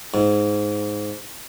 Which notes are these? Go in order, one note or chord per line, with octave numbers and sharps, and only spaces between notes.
G#2